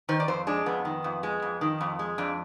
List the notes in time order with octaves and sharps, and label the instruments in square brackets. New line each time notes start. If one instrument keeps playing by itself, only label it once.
[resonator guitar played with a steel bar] D#3 C5
D5
F2 C5
G#3 D4
F2 B3
D#3
F2
G#3
F2
D#3
F2
G#3
F2 D4